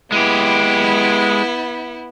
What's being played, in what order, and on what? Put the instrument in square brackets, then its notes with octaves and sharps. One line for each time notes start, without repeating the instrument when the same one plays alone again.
[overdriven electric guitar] G#3 G4 [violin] B3 E4